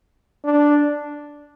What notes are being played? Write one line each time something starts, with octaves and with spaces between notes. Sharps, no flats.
D4